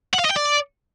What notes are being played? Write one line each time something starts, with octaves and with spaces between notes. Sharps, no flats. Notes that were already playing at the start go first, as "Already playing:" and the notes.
F#5
F5
D#5
G5
D5